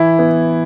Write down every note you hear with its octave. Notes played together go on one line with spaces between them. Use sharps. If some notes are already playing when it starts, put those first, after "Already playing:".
Already playing: E3 E4
B3